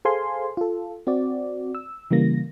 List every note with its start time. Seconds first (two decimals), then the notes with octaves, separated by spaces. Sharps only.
0.05 G#4 A4 C5 F5 G#5 C6
0.57 F4 A4
1.07 C4 F#4 D5
1.75 E6
2.11 C#3 E3 G3 A#3 A#6